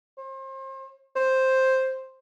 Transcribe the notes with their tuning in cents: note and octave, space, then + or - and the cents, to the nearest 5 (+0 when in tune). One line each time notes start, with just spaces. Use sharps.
C5 +35
C5 +5